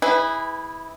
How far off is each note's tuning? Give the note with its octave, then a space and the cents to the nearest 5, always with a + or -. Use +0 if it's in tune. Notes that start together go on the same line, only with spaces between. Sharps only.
E4 -20 G#4 -20 B4 +15